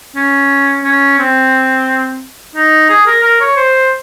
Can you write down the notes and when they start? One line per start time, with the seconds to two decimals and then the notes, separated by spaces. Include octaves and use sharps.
0.16 C#4
0.84 C#4
1.19 C4
2.56 D#4
2.89 G#4
3.07 A#4
3.23 A#4
3.41 C#5
3.57 C5